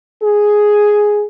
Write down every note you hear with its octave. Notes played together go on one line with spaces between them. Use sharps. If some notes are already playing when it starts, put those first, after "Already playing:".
G#4